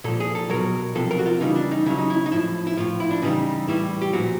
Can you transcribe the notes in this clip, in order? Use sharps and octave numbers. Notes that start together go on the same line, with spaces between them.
A#2 F3 A4
G#4
A4
B2 F#3 A#4
C3 F3 A4
A#4
F#4
F4
C#3 E3 G3 D#4
D4
D#4
C#3 F#3 E4
D#4
E4
D#4
A2 F3 E4
E4
A2 F3 F4
E4
D4
C#3 E3 G3 D#4
A2 E3 G3 E4
G4
A#2 F3 F#4